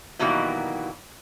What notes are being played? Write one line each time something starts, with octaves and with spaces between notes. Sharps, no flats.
B2 D#3 E3 F#3 G3 A#3